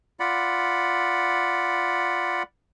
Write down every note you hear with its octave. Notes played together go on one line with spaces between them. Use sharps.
F4 D5 F#5 B5